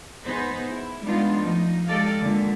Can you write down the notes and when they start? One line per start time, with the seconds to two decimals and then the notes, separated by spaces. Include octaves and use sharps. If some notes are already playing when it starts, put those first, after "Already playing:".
0.26 B3 D#4 G#4 B4 C5
0.69 E4
1.04 G3 G#3 B3 D4 D#4 F4
1.41 F3 A3 D#4
1.86 G#3 G4 A4 D5 D#5 F5
2.20 A#2 D3 D#3 G#3